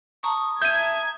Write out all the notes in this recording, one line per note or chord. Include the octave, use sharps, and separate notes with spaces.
A5 A#5 C#6 D#6
E5 G6 G#6 D#7